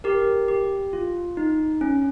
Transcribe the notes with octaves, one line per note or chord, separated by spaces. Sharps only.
G4 A#4
G4
F4
D#4
C#4